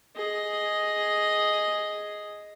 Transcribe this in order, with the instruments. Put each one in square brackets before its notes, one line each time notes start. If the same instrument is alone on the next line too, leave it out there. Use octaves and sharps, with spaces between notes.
[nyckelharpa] G#4 D#5